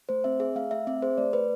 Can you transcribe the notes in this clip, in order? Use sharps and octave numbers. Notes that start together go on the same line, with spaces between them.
A3 C5
C4 E5
G#4 E5
A3 F5
A3 E5
C4 E5
G#4 C5
A3 D5
A3 B4